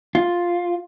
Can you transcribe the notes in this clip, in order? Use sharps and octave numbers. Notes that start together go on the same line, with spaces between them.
F4